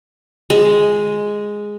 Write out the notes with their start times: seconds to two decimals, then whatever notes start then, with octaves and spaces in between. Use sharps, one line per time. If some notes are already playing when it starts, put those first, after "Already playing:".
0.50 G#3